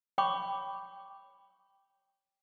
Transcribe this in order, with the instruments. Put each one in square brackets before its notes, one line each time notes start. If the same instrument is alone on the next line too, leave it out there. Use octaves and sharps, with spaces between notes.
[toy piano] C#5 G5 B5 C#6 D6